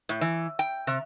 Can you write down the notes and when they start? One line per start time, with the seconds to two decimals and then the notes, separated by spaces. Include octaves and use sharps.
0.09 A2
0.21 E3
0.59 G5
0.87 C3